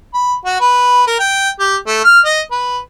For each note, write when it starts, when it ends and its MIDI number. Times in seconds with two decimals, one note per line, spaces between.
0.14 0.34 83
0.45 0.60 66
0.61 1.04 71
1.07 1.15 70
1.19 1.50 79
1.59 1.76 67
1.87 2.02 57
2.04 2.20 89
2.25 2.41 75
2.51 2.78 71